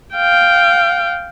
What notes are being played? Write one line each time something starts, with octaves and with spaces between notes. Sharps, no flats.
F5 G5